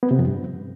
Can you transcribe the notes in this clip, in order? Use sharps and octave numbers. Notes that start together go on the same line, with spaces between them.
B3
C3
F2
G2